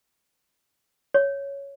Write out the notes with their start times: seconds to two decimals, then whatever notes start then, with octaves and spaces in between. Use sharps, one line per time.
1.14 C#5